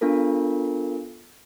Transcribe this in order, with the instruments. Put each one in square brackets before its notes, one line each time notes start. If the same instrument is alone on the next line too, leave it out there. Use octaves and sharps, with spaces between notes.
[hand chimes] B3 D4 F4 A4 A#4